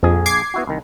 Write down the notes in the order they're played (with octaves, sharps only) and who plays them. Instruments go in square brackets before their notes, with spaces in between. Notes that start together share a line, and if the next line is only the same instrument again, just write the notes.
[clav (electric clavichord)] A#1 G#4 [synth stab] F2
[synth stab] D6 G#6 C7
[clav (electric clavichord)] B3 E4 F#4
C2 D#3